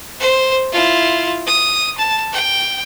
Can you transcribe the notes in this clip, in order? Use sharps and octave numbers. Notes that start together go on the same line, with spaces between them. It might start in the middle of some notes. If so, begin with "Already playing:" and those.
C5
E4 F4
D#6
A5
G5